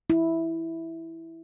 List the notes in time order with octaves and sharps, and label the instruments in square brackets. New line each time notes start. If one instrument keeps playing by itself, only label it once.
[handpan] E4